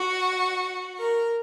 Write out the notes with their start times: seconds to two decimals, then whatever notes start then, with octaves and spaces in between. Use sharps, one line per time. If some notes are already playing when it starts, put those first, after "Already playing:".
Already playing: F#4
0.99 A#4